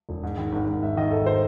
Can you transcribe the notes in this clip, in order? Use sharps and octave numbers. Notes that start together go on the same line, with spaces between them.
E1
G#2
D#3
G#1
G#1
G#2 E5
D#3 D#5
G#1 A4
C5